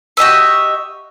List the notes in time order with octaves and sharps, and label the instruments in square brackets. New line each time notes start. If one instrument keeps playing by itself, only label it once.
[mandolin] F#4 G4 D#5 E5